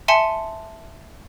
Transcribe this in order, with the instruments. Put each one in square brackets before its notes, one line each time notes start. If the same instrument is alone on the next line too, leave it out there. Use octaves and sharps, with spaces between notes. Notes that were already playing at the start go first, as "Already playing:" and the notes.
[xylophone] E5 G#5 A5 C6 C#7